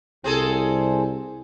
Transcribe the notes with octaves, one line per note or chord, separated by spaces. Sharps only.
C2 C4 G#4 A4